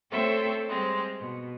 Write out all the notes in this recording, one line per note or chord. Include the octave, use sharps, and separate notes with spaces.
A3 C4 A4 C5 C#5 E5
G3 G#3 C4
B2